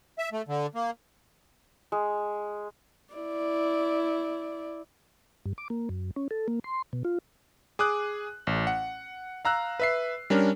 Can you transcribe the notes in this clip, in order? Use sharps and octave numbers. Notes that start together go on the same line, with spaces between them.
E5
A3
D3
A#3
G#3
E4 D5
G2
D6
A#3
F#2
C#4
A4
A#3
C6
B2
F4
G#4 D6 D#6 F#6
A1
F#5
F5 A#5 E6 F#6
B4 E5 C7
G3 C#4 D4 A#4